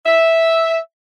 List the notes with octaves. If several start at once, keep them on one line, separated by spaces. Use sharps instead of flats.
E5